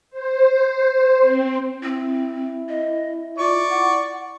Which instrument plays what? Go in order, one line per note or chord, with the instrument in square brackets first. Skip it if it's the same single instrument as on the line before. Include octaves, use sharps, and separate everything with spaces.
[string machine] C5
C4
[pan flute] C4 [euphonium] E4
[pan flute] D#5
[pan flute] F4 [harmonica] D5 C#6
[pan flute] F#5